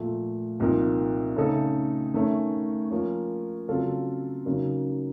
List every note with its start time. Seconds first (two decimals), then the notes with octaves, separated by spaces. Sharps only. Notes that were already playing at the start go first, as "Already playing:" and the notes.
Already playing: A#2 F3 A3
0.60 C2 A#2 F3 A#3 D#4
1.36 C#3 A3 D#4 A4
2.14 D#3 A3 C#4
2.91 F3 A#3 C#4
3.68 C#3 F#3 C4 F4 A4
4.45 C#3 F#3 A#3 D#4